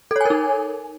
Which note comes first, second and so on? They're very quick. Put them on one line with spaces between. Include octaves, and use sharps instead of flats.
A4 C#5 G#5 A#4 D#4